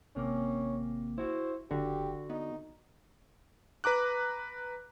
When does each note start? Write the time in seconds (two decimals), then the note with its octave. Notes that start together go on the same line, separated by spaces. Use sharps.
0.16 G#1 C3 A#3 C#4
1.18 E4 F#4 C5
1.71 F#1 D3 F#4 G4
2.30 B3 D#4
3.84 B4 A#5 D6 F#6